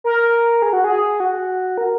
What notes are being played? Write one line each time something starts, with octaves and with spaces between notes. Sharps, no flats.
A#4
G#4
F#4
G#4
F#4
A#4